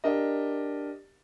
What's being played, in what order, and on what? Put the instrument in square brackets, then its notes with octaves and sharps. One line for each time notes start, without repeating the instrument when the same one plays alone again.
[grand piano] D4 G4 A#4 D#5